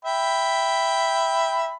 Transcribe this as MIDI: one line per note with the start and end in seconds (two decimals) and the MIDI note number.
0.05 1.74 76
0.05 1.74 79
0.05 1.74 83